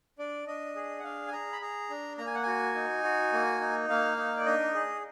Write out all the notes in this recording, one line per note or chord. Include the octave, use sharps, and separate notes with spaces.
D4 D5
D4 D#5
G#4
F#5
D4 F5
G#5
G#4 A#5
B5
G#4 A#5
D4
A#3 A#5
G#5
F#5
F#4 G#5
D#4
F#4
A#3
D#4
A#3 F5
D#4
D5
D4 D#5
G#4